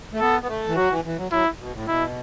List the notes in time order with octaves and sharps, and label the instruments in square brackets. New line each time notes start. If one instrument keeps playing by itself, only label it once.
[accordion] A3
[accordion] B3 [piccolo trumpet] A4
[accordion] B3
A3
E3
[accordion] F#3 [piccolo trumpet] F#4
[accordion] E3
E3
F#3
[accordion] F#3 [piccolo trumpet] E4
[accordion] B2
A2
[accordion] B2 [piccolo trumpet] E4